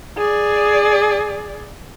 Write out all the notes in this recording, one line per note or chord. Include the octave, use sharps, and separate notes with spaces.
G#4 D5